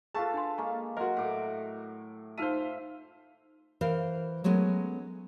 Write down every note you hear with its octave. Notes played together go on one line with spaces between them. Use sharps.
F4 G#4 A4 B4 F5 A5 C#6
D4 G#5 C6
G#3 A#3 G#5 A#5 C#6
F#3 F#4 A#4 D#5 C6
A2 D6
D#4 F4 C5 E5 F5 A5 D#7
E3 A#4 C5 F5
F#3 G#3 A3 B3 C#4